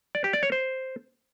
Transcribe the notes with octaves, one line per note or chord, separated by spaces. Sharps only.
D5
G4
D5
C#5
C5